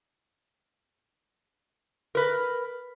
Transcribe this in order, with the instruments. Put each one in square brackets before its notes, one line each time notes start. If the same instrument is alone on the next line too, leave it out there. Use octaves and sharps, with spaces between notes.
[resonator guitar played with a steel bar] A#4 B4